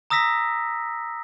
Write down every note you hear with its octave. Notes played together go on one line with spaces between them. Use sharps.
A#5 D#6 E6 A#6 B6